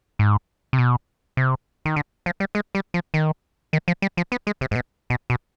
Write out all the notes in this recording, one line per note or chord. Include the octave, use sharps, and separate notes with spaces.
G#2
C3
B2
C3
D#3
D3
F3
G3
G#3
G3
F3
D#3
D#3
F3
G3
F3
B3
G#3
C3
G#2
B2
B2
B2